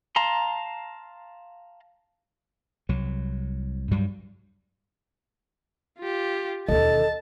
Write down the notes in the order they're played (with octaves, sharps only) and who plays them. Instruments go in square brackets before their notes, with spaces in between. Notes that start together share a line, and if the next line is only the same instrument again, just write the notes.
[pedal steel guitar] F5 A5 A#5 C6
[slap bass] C2 F#3
G2 F#3 G3
[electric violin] F4 G4
[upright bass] E1 D#2 [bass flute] A4 [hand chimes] D#5 [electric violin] A5